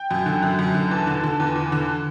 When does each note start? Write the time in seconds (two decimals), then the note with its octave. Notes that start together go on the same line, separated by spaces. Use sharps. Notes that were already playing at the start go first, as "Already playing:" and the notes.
Already playing: G5
0.11 F#2
0.26 D3
0.42 F#2
0.59 F#2
0.74 D3
0.91 E2 A5
1.07 D3
1.23 D3
1.40 E2
1.55 E2
1.72 D3